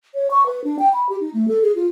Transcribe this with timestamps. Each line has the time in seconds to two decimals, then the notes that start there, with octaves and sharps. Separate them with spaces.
0.14 C#5
0.31 C#6
0.46 B4
0.64 D4
0.79 G5
0.93 B5
1.09 G4
1.21 D#4
1.34 A3
1.48 A4
1.62 G#4
1.75 F4